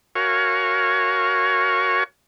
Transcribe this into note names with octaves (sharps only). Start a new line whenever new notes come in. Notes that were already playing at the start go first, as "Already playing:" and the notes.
F#4 A#4 C#5 F5 G#5 C#6